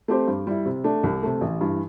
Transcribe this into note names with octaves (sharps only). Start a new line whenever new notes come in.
A3 C4 G4 C5
G2
G3 E4
C3
A3 D4
C2
C3 A3
A1
G2 E3